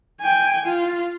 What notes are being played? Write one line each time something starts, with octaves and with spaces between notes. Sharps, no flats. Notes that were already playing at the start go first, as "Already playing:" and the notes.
G5 G#5
F4